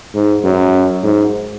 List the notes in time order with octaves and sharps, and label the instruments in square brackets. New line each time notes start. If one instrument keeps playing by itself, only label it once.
[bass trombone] G#2
F#2
G#2